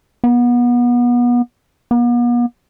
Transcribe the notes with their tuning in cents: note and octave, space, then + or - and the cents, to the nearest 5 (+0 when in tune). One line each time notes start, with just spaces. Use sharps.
B3 -30
B3 -45